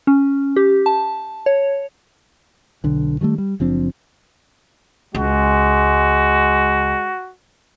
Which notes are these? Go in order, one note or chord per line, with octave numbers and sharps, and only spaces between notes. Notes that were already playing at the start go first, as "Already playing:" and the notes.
C#4
G4
A5
C#5
B1 D3
D#3 F3 G3 A3
G3
F#1 F3 C4 D4
C#2 G#3 F#4